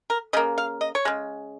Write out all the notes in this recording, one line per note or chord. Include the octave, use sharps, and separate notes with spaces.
A#4
C#3 A#3 D#5
F5
D#5
C#5
C#3 G#3